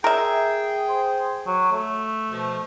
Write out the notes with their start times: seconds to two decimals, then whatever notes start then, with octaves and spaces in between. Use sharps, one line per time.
0.04 G#4 A#4 E5 G5
0.89 C5
1.47 F#3
1.73 A3
2.31 B2 F3